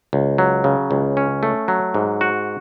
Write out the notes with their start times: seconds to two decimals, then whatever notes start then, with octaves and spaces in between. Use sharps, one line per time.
0.13 C#2
0.38 F#3
0.64 C#3
0.91 C#2
1.17 C#4
1.43 A3
1.68 F#3
1.94 G#2
2.21 F#4